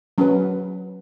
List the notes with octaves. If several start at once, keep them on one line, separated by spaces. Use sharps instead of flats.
F#3 C#4 F#4 B4